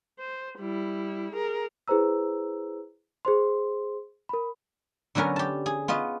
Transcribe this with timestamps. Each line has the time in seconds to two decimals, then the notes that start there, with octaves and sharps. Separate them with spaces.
0.19 C5
0.58 G3 E4
1.33 G#4 A#4
1.88 E4 G#4 B4 C5 A#5 E6
3.25 G#4 C5 C6
4.29 A#4 B5
5.15 D3 F#3 B3 C#4 A#4
5.36 G4 A5
5.66 G#4
5.88 B3 F4 F#4 D#5